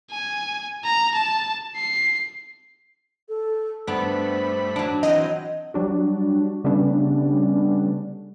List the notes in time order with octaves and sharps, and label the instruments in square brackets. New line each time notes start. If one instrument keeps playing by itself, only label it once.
[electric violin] G#5
A#5
A5
C7
[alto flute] A4
[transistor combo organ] G2 A3 B5 [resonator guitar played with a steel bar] B3 D4 [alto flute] C5
[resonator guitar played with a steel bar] F#3 D4
[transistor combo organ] E3 C4 [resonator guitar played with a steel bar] F#3 [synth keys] D#5
[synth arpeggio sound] F#3 G3 D4 F#4
C#3 G3 A3 B3 C#4 D4